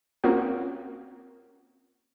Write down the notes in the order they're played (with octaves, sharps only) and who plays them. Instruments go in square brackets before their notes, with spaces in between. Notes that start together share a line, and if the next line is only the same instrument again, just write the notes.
[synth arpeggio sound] A#3 C4 C#4 F4 F#4